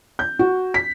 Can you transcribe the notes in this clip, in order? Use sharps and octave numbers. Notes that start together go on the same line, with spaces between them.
G6
F#4
B6